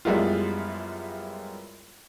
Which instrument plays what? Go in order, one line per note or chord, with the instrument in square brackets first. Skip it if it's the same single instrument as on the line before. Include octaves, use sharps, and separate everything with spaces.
[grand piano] F#2 G3 G#3 B3 E4 F4